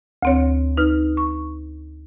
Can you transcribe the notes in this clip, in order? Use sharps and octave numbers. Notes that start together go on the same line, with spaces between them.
D2 C4 C#5
D#4 B4 F6
C#6